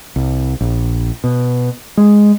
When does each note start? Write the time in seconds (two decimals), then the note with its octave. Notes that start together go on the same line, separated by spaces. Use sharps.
0.16 C2
0.61 A#1
1.24 B2
1.97 G#3